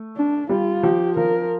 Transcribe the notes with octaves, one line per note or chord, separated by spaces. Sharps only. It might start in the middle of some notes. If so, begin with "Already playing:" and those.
Already playing: A3
D4
G3 F4
F3 G4
F3 A#4